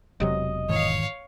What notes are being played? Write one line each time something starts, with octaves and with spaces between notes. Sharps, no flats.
E1 C3 F#3 D#5
G#2 D#3 E3 C#5 F5